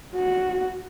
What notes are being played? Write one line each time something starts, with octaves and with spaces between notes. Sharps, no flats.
F#4